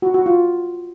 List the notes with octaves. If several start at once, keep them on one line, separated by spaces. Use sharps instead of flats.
F#4
F#4
F4